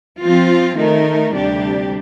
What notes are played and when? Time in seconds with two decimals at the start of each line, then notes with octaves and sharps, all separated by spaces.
0.21 F3 C4 F4
0.77 D#3 A3 D#4 A#4
1.33 D2 C3 G3 D4 G4